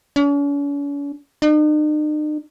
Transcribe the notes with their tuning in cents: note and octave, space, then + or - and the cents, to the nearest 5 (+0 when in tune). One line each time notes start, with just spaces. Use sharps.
C#4 +45
D#4 -45